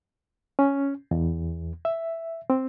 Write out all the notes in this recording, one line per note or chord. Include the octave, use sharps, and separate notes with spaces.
C#4
E2
E5
C4